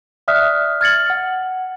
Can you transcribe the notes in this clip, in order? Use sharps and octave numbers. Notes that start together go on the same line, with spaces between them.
D5 E5 D#6 F6 F#6 B6
F6 G#6 A6 C#7 F#7
F#5